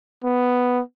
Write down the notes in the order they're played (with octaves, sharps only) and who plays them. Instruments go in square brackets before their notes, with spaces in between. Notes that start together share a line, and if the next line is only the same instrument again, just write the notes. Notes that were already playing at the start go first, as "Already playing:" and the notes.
[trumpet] B3